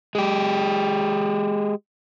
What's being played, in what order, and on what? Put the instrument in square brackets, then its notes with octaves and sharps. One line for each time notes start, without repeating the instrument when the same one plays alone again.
[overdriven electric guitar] G#3 G4